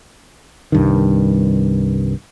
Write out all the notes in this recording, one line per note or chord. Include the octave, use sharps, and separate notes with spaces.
C2 G2 D#3